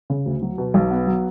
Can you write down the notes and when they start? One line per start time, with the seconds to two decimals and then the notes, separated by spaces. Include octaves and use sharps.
0.10 C#3
0.26 D2
0.42 F#3
0.58 B2
0.74 B1
0.91 B3
1.07 F#3